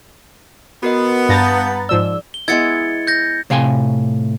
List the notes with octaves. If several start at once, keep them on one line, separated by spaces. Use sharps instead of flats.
B3 F#4 A#4 D#5
G2 F5 A5 A#5 G6 A6
G#2 F3 D5 E6
G7
G#3 B3 E4 G#6 A6 C#7
G6 A#6
A2 C3 F5 G5 G#5 C6